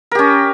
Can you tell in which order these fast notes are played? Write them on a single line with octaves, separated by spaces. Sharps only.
A#4 G4 C#4